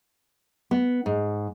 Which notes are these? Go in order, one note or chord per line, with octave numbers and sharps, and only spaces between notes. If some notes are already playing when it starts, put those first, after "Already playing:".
B3
G#2